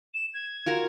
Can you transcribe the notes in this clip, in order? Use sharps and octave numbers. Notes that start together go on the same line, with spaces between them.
E7
G#6
F4 F#4 A#4